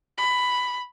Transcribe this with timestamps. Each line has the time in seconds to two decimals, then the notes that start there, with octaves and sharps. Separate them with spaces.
0.17 B5